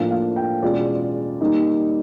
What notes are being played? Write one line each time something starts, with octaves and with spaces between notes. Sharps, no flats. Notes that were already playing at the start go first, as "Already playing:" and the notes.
Already playing: A2 F3 A#3 D4 F4 F5
F5
G5
E2 B2 G#3 C#4 F4 D5
D#3 G3 A#3 D#4